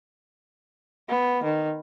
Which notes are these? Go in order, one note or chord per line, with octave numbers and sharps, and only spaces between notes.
B3
D#3